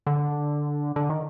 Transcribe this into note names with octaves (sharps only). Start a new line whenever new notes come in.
D3
D3
D#3